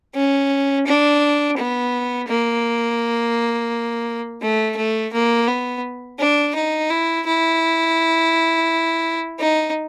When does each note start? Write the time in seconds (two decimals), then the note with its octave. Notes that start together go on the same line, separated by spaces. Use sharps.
0.14 C#4
0.86 D4
1.57 B3
2.28 A#3
4.41 A3
4.77 A3
5.13 A#3
5.47 B3
6.19 D4
6.55 D#4
6.90 E4
7.26 E4
9.39 D#4